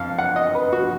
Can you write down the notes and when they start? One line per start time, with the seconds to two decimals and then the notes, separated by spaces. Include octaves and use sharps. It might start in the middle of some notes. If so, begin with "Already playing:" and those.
Already playing: F2 F5
0.19 F#5
0.36 D#5
0.55 B4
0.73 F#4